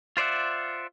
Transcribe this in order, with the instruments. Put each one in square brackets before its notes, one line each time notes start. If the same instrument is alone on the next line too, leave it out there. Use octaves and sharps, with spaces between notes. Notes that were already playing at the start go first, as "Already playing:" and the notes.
[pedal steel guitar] F4 C5 D5 E5 F#5